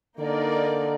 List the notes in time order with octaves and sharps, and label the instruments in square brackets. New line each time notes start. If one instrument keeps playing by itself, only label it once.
[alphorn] D3 [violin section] A#3 D#4 A#4 D5